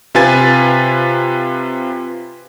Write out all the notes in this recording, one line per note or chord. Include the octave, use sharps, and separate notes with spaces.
C3 F4 B4 G#5 A6